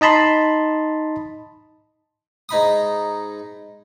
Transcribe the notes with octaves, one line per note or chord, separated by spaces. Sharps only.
D#4 D#5 A5 B5 C6
G#2 D#4 B5 D#6